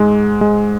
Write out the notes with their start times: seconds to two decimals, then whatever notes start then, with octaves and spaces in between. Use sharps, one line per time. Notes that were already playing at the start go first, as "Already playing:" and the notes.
Already playing: G#2 G#3
0.41 G#3